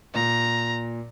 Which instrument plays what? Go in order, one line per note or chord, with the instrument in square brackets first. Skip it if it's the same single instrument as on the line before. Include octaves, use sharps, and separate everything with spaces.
[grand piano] A#2 [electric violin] A#5